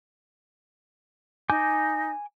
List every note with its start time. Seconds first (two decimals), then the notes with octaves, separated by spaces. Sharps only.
1.50 D#4 G#5 D6 G6